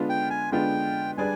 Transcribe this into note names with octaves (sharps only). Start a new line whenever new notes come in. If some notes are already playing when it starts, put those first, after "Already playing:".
Already playing: D3 G#3 B3 D4 F4
G5
G#5
D3 G#3 B3 D4 F4 G5
G3 D4 G#4 B4 D5 G#5